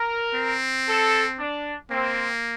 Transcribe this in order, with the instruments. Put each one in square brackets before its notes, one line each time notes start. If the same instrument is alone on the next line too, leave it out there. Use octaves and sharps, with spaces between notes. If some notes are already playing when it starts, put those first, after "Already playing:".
Already playing: [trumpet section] A#4
[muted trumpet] C4
[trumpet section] A4
D4
[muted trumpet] A#3 [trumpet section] C4